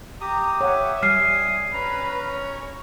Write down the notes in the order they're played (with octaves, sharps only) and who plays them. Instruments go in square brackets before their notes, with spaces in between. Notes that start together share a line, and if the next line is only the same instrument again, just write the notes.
[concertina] G4 D#6 [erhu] A#5
[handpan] C#5 F#5 [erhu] E5
[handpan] G3 [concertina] G#5 D#6 [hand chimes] F6 C7
[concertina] C#4 A#5 [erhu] B4
[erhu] C#5